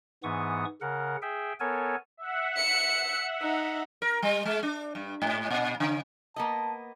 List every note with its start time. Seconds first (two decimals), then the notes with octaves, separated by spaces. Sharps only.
0.23 G#2 E3 B3 C#6 D#6
0.81 C#3 A#4 F#5
1.22 G#4 E5 G5
1.60 B3 A4 A#4 C#5 G#5
2.17 E5 F#5
2.57 C#7
3.41 D#4
4.02 A#4
4.22 G3
4.45 G#3
4.63 D4
4.95 G2
5.22 G#2
5.50 A#2
5.80 C#3
6.36 A#3 B3 D#5 A5